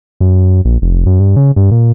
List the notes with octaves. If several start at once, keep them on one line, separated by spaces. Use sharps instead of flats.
F#2
A#1
F1
F#2
G2
C#3
G2
A#2